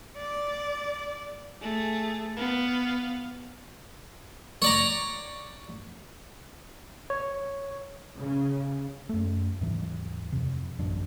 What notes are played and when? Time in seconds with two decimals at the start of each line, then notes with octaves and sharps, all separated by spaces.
0.17 D5
1.61 A3 G#4
2.37 B3 F5
4.62 C#5 D5 A#5
7.10 C#5
8.20 C#3
9.09 F#2 A3
9.61 D#2 G#2 E3
10.33 F2 C3
10.79 D1 A1 F#2 D4